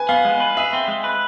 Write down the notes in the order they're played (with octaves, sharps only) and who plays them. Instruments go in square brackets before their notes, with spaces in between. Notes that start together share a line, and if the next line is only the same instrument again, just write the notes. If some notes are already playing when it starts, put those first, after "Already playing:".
Already playing: [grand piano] B4 G#5
[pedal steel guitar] B3 [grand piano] F5
[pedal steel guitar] G#3
B4
[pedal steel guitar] G#4 [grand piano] E5
[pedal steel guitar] C4
G#3
B4